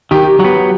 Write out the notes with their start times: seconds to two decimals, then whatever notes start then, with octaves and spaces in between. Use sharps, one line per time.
0.11 D#3 G4
0.40 F#3 B3